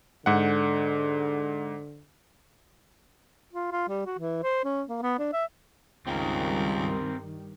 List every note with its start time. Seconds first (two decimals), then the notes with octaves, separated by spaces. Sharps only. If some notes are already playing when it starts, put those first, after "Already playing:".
0.26 G#2 D3 F#5
3.53 F4
3.72 F4
3.88 G3
4.06 F#4
4.19 E3
4.43 C5
4.64 C#4
4.89 A#3
5.02 B3
5.19 D4
5.33 E5
6.07 C#2 G2 D#3 G3 C4 A#4